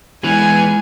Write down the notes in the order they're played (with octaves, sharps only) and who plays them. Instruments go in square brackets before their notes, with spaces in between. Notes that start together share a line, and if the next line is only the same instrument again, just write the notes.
[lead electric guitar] E3 B3 [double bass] G#3 [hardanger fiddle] G#5